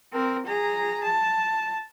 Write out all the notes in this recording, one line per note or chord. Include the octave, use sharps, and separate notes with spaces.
C4 A#4
G#4 A#5
A5